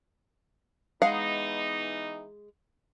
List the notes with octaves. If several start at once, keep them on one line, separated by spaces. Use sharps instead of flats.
E3 G#3 B3 D#4 F5 F#5